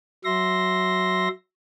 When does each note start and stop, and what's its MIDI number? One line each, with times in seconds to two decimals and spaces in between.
0.25 1.28 54
0.25 1.28 76
0.25 1.28 84
0.25 1.28 94